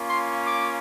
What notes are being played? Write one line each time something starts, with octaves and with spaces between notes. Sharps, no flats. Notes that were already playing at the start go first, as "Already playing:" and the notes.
Already playing: A#3 C#4 F4
C6
D6